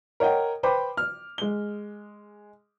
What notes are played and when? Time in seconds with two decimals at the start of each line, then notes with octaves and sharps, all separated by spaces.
0.20 A#4 C#5 D#5 F#5 G5
0.63 B4 C5 G5 B5 D6
0.97 F6
1.38 G#3 G7